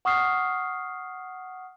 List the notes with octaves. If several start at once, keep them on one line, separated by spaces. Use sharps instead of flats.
F#5 C#6 D#6 F6 C7